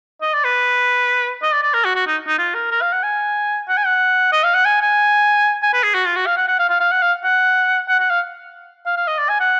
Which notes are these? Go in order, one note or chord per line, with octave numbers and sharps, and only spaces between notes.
D#5
D5
B4
D#5
D5
D5
A#4
F#4
F#4
D#4
D#4
F4
A#4
A#4
F5
F#5
G#5
F#5
G#5
F#5
D#5
F5
F#5
G#5
G#5
G#5
B4
G#4
F#4
F4
F#4
F5
F#5
F#5
F5
F5
F5
F#5
F5
F#5
F#5
F#5
F5
F5
F5
D#5
D5
G#5
F#5